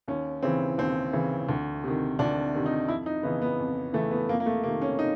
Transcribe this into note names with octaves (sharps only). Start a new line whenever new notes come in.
D#2 C#4
C#3 E3 C4
D#2 C4
C#3 E3
D2
C3 D#3
D2 D4
C3 D#3
D#4
F2 E4
D#4
C#3 E3 B3
B3
F2
C#3 E3 A3
B3
F2 A#3
A#3
A3
C3 D#3 A#3
C#4
D#4